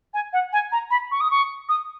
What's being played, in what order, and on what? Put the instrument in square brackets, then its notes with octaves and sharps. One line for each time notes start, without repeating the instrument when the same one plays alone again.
[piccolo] G#5
F#5
G#5
A#5
B5
C#6
D#6
C#6
D#6